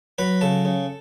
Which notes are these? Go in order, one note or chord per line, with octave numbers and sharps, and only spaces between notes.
F#3 B4 B5
C#3 A4 A5
C#3